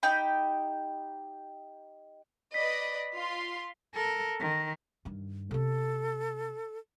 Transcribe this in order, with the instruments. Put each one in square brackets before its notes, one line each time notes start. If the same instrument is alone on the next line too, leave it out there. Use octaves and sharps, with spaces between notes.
[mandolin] D#4 G4 G5 B5
[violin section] B4 D5 D#5 [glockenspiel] B6
[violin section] F4 C6
[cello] A4 A#4
D#3
[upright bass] G2 D#3
[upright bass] C3 C#4 [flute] A4